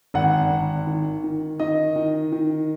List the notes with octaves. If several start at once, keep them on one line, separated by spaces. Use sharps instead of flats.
G#1 F#5
G#1
D#3
D#3
D#3 D#5
D#3
D#3